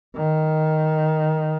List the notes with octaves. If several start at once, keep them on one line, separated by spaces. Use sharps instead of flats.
D#3